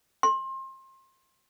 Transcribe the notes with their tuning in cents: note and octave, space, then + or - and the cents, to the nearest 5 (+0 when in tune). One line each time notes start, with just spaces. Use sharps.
C6 +30